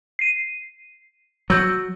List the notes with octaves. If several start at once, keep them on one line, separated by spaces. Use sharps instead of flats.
C7 D#7
F#3 E6 G6